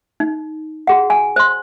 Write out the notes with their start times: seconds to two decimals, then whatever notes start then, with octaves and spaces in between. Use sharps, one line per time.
0.20 D#4
0.87 F#4 G#4 F#5
1.10 G#5
1.36 C5 C6